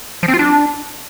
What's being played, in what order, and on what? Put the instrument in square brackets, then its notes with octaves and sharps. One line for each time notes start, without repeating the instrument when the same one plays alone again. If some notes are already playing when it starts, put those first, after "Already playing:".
[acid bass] F3
C4
F4
D4